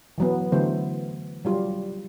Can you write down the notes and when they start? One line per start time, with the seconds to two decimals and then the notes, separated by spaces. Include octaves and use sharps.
0.18 E3 F#3 B3
0.52 D3 E3 F#3 A3 B3 C5
1.45 F#3 G3 F4